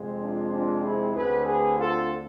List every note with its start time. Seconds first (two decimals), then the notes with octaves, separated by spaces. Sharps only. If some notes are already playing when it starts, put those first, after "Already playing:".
Already playing: F2 C3 G#3 C4
0.20 D4 F4
0.52 D4 F4
0.83 E4 G#4
1.14 D2 D3 A3 C4 G#4 B4
1.45 G#4 B4
1.76 F4 A4